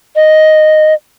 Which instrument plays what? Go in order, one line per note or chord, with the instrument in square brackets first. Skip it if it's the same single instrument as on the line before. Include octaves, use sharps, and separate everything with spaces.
[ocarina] D#5